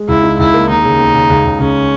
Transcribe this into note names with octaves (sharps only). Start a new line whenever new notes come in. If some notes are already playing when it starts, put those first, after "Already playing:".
Already playing: G#3
C#2 E4
D#4
C#2 E4
A#3
D#2 D#4
C#3
D#2
C#3
C#2
C#2
C#2 C#4